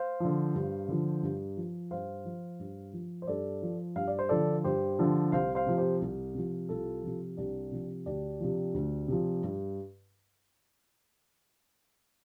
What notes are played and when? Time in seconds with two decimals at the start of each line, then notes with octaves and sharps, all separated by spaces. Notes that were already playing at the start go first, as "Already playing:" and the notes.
Already playing: C5 F5
0.20 D3 F3
0.55 G2
0.88 D3 F3
1.23 G2
1.57 F3
1.91 G2 C5 F5
2.25 F3
2.59 G2
2.93 F3
3.22 C5
3.27 G2 A4 D5
3.63 F3
3.96 G2 F5
4.08 D5
4.19 C5
4.29 D3 F3 A4 D5
4.64 G2 G4 C5
4.99 D3 F3
5.32 C2 C5 F5
5.55 C5 F5
5.66 C3 F3
5.78 G4 C5
6.02 C2
6.35 C3 F3
6.69 C2 F4 A4
7.03 C3 F3
7.37 C2 D4 G4
7.72 C3 F3
8.06 D2 D4 G4
8.40 C3 F3
8.74 D2
9.08 C3 F3
9.43 G2